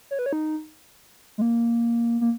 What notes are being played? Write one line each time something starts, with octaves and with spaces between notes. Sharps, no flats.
C#5
B4
C#5
D#4
G#3
A#3
A#3